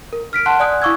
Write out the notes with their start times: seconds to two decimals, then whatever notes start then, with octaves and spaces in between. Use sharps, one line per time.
0.13 A#4
0.33 F6 B6 D7
0.46 F#5 A5 C6 F#6
0.60 D5 G#5 D#6 F#6
0.82 E4 F5 C#6 D6 E6 G#6